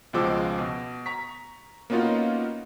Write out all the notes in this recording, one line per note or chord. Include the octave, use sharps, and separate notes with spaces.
C#2 B2 F3 G#3 D6 E6
B2
A#5 C#6 B6
A#3 B3 C#4 D#4 F4 F#4